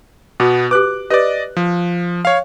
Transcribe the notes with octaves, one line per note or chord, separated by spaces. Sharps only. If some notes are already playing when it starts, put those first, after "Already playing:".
B2 B3 F#4
G4 B4 D6 F#6
G4 B4 D5 D#5
F3
C#5 F5